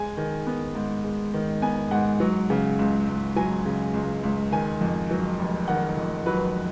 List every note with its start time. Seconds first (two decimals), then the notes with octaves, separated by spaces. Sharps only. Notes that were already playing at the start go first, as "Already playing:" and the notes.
Already playing: G#3 G#5
0.17 D#3
0.47 B3
0.75 G#2
1.04 G#3
1.34 D#3
1.62 B3 G#5
1.91 G#2 F#5
2.20 F#3
2.50 C#3
2.79 C#2
3.08 C#2
3.36 F#3 G#5
3.66 C#3
3.94 C#2
4.23 C#2
4.52 D#3 G#5
4.81 F2
5.11 F#3
5.39 F1
5.68 D#3 F#5
5.97 F2
6.26 F#3 B4